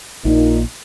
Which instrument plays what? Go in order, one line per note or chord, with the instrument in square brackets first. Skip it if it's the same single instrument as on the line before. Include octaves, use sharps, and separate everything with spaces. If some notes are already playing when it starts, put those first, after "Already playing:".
[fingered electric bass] A#1 A#3 [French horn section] A#2 D#4